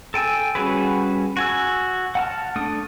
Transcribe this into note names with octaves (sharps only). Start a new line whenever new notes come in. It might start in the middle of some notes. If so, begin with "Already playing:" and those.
A4 G5 G#5 E6
G3 C#4 F#4 G#4 B4
F#4 G#5 E6
F#5 A5 F6
A3 D4 D#6